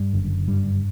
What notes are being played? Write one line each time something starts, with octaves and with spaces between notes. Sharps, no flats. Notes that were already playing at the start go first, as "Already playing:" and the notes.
Already playing: G2 G3
F#1 F#2 D3
G2 G3